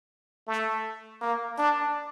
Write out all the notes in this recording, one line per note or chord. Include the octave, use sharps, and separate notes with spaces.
A3
A#3
D4